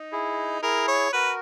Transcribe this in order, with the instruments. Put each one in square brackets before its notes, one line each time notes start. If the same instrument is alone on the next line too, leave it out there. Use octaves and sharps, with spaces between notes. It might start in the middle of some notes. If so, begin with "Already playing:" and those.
Already playing: [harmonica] D#4
[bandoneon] E4 G#4
[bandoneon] E4 G#4 [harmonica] A#4
[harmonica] C#5
[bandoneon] F#4 A#4 [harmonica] B4